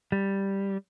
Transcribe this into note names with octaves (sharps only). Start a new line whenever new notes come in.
G3